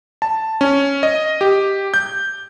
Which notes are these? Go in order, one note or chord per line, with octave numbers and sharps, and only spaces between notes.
A5
C#4
D#5
G4
G6